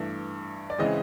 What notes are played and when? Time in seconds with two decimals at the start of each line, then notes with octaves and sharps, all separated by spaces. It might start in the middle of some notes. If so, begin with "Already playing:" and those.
Already playing: G2 E3 A3
0.70 D5
0.79 C#3 E3 G#3 C4 D#5